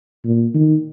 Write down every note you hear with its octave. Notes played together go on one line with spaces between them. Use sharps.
A#2
D#3